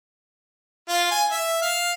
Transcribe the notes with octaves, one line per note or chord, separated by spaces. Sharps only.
F4
G#5
E5
F5